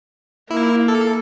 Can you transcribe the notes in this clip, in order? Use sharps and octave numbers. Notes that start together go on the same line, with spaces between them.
A#3 E4
A4